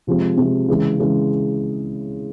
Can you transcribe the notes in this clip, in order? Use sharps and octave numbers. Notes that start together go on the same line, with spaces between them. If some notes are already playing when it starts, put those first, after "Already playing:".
C3 F3 G#3 C4
C3 F3 G#3 C4
C#3 E3 G#3
C#3 E3 G#3